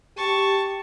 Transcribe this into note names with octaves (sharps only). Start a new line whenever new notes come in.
G4 A5 C#6